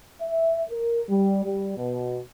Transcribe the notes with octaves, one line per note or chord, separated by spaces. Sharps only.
E5
A#4
G3
G3
B2